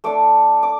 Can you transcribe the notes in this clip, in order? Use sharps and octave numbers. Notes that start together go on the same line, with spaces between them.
A3 D4 D6
D6